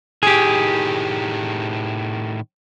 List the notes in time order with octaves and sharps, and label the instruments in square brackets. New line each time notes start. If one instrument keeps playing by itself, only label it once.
[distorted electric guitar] A2 D#3 [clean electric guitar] G4 G#4